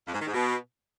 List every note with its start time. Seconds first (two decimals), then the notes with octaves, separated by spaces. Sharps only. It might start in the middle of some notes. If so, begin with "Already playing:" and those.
0.07 F2
0.13 G#2
0.20 D#3
0.27 G#2
0.34 B2